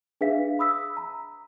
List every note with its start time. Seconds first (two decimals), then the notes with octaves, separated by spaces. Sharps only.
0.21 D4 G#4 B4 E5 F5 B6
0.59 B5 D#6 E6 B6
0.97 A#5